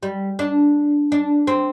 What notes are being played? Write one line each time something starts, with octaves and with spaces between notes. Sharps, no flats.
G3
D4
D4
C4